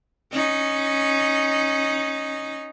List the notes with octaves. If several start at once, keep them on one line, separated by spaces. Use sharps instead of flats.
C#4 D#4